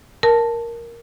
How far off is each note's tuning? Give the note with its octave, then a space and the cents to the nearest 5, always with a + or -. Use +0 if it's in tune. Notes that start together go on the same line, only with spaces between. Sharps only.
A#4 +0 A5 +0